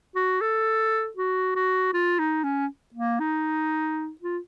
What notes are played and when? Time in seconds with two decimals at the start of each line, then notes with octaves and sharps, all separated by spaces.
0.16 F#4
0.41 A4
1.17 F#4
1.56 F#4
1.94 F4
2.19 D#4
2.44 C#4
2.94 A#3
3.20 D#4
4.21 F4